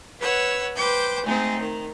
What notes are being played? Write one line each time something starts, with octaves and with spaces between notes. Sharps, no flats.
B4 C#5 F#5 E6
B4 C5 G5 D6 G6
G#3 A3 C4 D#4
D#3